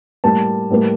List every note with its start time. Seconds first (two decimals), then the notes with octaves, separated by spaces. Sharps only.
0.24 A2 G3 A#3 A5
0.70 A2 G3 A#3